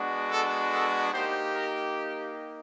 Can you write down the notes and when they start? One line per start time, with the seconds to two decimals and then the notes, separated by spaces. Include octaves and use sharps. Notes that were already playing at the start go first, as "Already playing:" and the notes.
Already playing: G#3 B3 D4 F#4
0.30 A4
0.71 A4
1.13 A#3 D#4 G4 C5
1.54 A#4